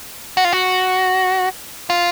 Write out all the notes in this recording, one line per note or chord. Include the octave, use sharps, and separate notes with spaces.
F#4
F4
F#4
F4